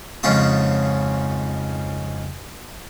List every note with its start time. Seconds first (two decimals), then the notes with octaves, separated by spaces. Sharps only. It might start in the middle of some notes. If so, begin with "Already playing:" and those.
0.23 F2 G#2 C#3 C#4 F4 D#6